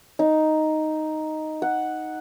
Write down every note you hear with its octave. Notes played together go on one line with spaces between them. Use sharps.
D#4
F#5